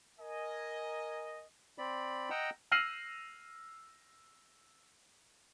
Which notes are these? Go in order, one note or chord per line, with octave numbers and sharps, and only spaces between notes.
A#4 D#5 G#5
C4 D5 B5
D#5 F#5 G5 A#5 E6
E6 F6 A#6 C7 D#7 F#7